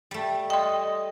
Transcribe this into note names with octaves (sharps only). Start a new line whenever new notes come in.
G3 A3
D#5 G5 C6